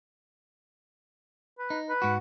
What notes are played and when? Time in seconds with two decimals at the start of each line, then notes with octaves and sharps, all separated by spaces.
1.59 B4
1.70 D#4
1.89 B4
2.02 G#2 F#4